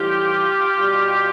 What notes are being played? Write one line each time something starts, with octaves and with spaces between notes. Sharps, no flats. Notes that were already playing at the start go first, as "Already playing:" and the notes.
Already playing: A2 E3 G3 F4 G4
B2 G3